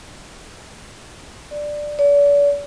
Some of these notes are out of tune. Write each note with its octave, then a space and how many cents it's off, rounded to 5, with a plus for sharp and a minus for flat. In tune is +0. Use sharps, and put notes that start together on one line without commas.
D5 +10
D5 -40